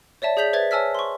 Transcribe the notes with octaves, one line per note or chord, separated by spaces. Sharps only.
C#5 D5 E5 A5
G#4 D5 G6 B6 F7 F#7
B4 C5 E5 G#6 A6
C#5 G#5 A5 E6 F6 B6
C6 C#6